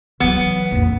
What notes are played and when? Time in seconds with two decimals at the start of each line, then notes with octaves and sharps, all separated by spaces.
0.20 E3 F#3 B3
0.71 A#1 F2